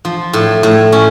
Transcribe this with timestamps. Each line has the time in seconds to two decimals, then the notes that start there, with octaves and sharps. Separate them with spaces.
0.05 F3
0.33 A2
0.63 A2
0.92 C#4